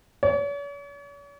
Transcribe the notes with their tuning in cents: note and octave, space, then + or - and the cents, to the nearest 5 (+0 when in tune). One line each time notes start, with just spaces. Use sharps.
C#5 +45